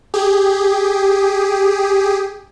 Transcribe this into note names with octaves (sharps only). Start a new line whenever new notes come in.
G4 G#4